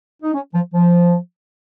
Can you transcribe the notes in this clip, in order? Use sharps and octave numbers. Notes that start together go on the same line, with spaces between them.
D#4
C#4
F3
F3